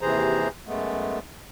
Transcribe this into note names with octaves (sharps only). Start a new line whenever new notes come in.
D#2 C3 E3 G#4 C5 A#5
F#2 G#3 A3 B3